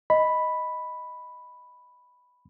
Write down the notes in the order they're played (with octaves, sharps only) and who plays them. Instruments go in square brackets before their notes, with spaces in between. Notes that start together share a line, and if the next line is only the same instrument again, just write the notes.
[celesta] D#5 [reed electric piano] B5